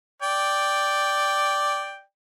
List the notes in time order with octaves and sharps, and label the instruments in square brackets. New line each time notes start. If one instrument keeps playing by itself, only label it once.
[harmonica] D5 G5